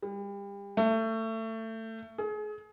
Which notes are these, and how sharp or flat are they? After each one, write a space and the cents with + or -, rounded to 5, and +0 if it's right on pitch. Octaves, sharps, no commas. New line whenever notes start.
G3 +35
A3 +25
G#4 +30